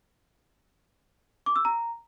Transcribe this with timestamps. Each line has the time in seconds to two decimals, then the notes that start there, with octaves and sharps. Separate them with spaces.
1.46 D6
1.56 E6
1.65 A#5